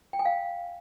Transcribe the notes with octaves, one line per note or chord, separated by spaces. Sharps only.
G5
G#5
F5